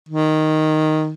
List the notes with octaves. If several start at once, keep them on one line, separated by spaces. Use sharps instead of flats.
D#3